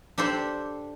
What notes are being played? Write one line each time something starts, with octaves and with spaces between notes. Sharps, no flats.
D4 G4 A4 C5